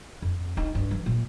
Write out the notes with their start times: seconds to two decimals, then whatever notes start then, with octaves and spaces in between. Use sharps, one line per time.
0.22 F2
0.57 D#4
0.75 G2
0.91 E3
1.06 A#2